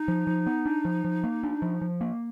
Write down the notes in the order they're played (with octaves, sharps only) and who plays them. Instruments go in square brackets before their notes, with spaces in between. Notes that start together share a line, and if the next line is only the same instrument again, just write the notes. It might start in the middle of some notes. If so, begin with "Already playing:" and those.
Already playing: [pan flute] D#4
[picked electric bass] F3
F3
B3
D4
F3
F3
A#3
D4
F3
F3
A#3